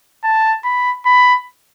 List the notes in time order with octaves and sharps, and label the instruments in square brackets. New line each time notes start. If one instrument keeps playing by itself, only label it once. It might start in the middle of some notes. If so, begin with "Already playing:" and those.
[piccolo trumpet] A5
B5
B5